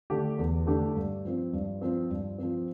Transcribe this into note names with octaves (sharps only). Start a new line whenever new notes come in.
D3 A3 D4 G4
E2
D3 A3 D4 G4
G2
F3 C4
G2
F3 C4
G2
F3 C4